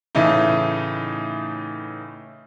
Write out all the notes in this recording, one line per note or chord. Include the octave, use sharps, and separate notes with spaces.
A2 C#3 E3 A3 D#4